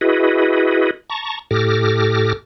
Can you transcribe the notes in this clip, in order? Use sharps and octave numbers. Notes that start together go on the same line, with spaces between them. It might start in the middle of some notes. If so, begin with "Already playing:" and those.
E4 F#4 G#4 B4 D#5
A5 A#5 C#6
A2 G4 A4 D6 F6 A#6